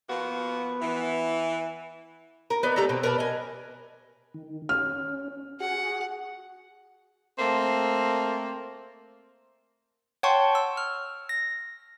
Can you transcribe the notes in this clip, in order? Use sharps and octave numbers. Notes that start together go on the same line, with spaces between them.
F3 A#3 B3 F#4
E3
A#4
B3 D#4 D5
A3 G4 A4 A#5
B2 C4
A#4 B4 D5 A5
D#5 G#5
D#3
C#4 F6
F#4 G#4 F#5
A3 A#3 C4
C#5 F#5 G5 A5 C6 C#6
E6
F6
A#6